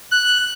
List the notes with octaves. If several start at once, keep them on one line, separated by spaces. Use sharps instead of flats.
F#6